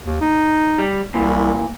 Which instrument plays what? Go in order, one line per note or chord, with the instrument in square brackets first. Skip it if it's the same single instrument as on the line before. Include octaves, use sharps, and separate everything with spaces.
[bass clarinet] D#2
D#4
[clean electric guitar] G3
[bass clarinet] C2 [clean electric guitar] A#2 E3